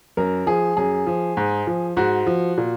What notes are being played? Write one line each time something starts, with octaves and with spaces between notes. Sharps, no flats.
F#2 A#4
F3 G#4
F#2 G#4
F3
G#2
F3
G#2 F#4
F3
A#2